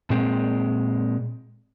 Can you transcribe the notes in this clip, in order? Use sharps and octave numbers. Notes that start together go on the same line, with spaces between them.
A#2 G#3 C4